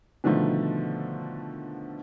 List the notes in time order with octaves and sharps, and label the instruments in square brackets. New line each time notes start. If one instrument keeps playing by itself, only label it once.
[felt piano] B2 D3 D#3 F3 A3